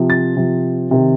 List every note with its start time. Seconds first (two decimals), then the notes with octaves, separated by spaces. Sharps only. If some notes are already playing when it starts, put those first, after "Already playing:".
Already playing: C3 F3
0.10 A6
0.37 C3 F3
0.91 C3 D#3